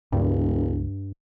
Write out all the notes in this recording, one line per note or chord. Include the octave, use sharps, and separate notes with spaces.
E1 C#2 G2